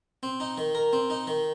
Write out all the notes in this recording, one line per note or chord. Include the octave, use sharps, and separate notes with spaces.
C4
D#4
D#3
A#4
C4
D#4
D#3